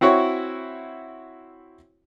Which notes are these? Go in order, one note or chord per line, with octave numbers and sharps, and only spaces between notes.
C4 E4 F#4 C#5